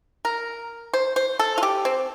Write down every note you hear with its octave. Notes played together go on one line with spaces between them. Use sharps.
A#4
C5
C5
A4
F4
G4
C4